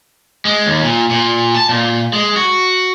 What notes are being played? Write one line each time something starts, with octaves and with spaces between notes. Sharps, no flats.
G#3
D#2
A#2
A#2
A5
A#2
G#3
F#4